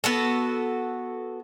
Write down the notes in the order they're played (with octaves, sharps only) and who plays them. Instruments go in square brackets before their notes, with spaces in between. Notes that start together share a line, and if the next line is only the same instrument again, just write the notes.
[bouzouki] B3 F#4 A4